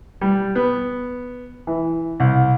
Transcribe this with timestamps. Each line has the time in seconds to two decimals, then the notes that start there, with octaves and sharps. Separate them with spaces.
0.21 G3
0.55 B3
1.67 E3
2.20 C2